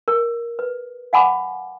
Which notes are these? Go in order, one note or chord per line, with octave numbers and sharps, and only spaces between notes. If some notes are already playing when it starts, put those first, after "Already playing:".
A#4
B4
F5 F#5 G#5 B5 D6